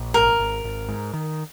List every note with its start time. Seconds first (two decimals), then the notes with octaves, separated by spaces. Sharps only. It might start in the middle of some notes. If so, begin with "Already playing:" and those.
Already playing: A#1
0.14 G#1 A#4
0.39 G#1
0.64 G#1
0.88 G#2
1.14 D#3